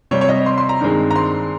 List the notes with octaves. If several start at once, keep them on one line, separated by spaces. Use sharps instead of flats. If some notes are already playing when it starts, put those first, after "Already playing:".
C3 G3 C4 C#5
C#5
D#5
C6
C6
A#5
G2 D#3 G#3 C4
A#5
C6